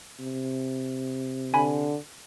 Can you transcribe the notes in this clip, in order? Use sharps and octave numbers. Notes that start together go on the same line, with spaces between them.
C3
D3 G#5 B5